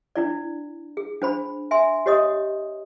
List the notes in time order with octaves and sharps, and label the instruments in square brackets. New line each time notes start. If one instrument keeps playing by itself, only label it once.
[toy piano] D4 E4 D5
G#4
D4 C5 B5
E5 G#5 C6
G4 C#5 D#5 D#6